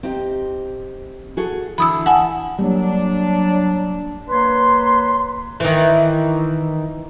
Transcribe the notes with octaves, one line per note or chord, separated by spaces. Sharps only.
C4 D#4 G4
F#4 G#4 A4
D3 E3 B5 D#6 E6
F#5 G#5 A5
F#3 G3 A#3 D4
A#3 B4 C#5 C6
D#3 E3